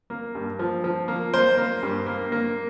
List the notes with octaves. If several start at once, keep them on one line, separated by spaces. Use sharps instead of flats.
A#3
G2
F3
F3
A#3
A#3 C5
A#3
G2
A#3
A#3